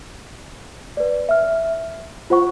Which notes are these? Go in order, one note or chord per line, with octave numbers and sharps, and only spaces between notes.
B4 D5
E5 F6
F4 C5 F#5 C#6